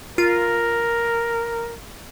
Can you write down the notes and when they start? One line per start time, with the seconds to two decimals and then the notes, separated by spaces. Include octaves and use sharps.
0.18 F4 A#4